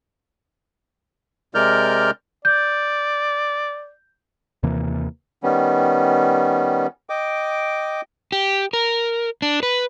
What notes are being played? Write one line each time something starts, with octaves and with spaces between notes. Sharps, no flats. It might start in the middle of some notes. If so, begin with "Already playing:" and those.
C3 G#3 A#4 D5 F6 G6
D5 G6
D#2 C3 E3 A#3
D#3 G3 B3 C#4
D#5 G5 D6
G4
A#4
D4
B4